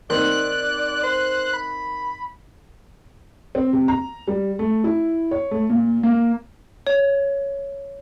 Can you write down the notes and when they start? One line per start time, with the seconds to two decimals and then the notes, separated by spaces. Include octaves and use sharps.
0.10 D#3 C4 D5 F#6
1.03 C5
1.53 B5
3.55 C4
3.73 C3
3.88 A#5
4.28 G3
4.59 A3
4.84 E4
5.31 C#5
5.51 A3
5.70 A#2
6.03 A#3
6.87 C#5